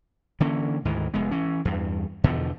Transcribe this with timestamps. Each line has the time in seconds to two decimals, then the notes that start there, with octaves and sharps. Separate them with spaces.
0.40 D3 E3 A#3 C#4
0.85 D2 G#2 D#3 E3
1.14 F1 G#3 B3
1.31 E3 C#4
1.65 E2 G2
2.24 E2 B2 D3 F3